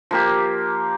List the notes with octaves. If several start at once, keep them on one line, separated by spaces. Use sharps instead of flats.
F3 A#3 G4